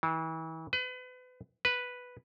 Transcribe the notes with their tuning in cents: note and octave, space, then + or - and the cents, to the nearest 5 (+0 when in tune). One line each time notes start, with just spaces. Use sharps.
E3 -35
B4 +35
B4 +0